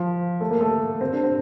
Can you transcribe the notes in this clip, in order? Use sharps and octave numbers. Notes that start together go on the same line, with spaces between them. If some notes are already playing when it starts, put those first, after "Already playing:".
Already playing: F3
A3
A#3
A3
C4
D4
C4